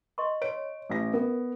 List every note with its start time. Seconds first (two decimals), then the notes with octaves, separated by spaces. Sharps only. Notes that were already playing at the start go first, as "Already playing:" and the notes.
0.18 D#5 C6 C#6
0.42 C#5 D7
0.90 A1 A#6
1.14 B3 A#4